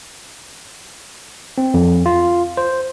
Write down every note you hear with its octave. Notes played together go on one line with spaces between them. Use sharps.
C4
F2
F4
C5